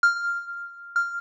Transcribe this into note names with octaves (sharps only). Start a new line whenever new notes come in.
F6
F6